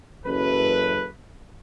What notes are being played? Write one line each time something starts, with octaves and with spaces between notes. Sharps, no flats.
F#1 F#2 E3 A4 B4